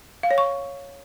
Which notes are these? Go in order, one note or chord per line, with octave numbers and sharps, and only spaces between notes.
F5
C#5
C#6